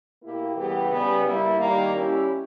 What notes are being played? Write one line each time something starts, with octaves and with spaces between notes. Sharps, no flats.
B2 A#3 E4 G4
C#3 E3 G3 B3 G4
C#3 G3 B3
G2 G3 A#3 E4
D#3 G3 A#3
G3 C#4 E4 G4